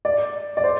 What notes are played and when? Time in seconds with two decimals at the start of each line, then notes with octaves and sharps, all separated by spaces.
0.05 D5
0.57 D5
0.64 C5